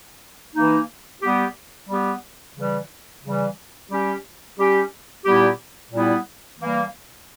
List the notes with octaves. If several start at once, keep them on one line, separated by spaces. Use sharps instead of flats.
E3 A#3 D#4
G3 B3 G4
G3 B3 G4
C#3 E3 G3
C#3 E3 G3
G3 C#4 G4
G3 C#4 G4
A#2 G3 B3 E4 G4
A#2 G3 B3 E4 G4
E3 G3 A#3